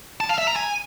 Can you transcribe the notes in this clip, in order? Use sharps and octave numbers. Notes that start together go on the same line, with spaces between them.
A5
F5
E5
A#5
G#5